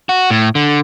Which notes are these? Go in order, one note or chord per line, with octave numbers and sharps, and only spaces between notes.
F#4
A2
D3